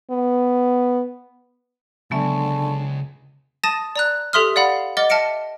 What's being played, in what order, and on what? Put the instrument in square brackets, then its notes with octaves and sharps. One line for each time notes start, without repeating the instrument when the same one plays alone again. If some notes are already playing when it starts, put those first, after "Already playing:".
[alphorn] B3
[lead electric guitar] C#2 [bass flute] D3 [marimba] F#3 B3 E5 [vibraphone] G#5 A5 C#6
[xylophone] A5 D#6 A6 A#6 D#7 E7
D5 A#5 F#6
G4 A4 E5 C6 D#6 F6
D5 F5 F#5 B5
D#5 F#5 D6 F6 A6 G7
E5 A5 F6 A#6 C#7 D7